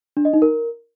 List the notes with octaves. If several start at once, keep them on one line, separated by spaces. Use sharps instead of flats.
D4
D#5
D#4
A#4